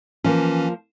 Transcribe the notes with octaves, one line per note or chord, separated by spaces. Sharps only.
E3 F3 A#3 C#4